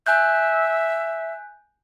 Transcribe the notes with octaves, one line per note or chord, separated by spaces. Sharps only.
E5 G#5 F#6 G6